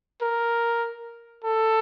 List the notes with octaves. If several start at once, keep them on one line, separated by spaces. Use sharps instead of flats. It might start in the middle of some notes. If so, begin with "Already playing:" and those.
A#4
A4